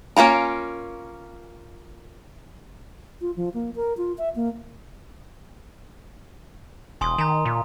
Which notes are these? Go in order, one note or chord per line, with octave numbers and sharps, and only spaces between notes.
A#3 C#4 F4 A#4
F4
F3
A#3
A#4
F4
E5
A#3
E1 G#5 C6 D#6
D#3 G#5 A#5
A#2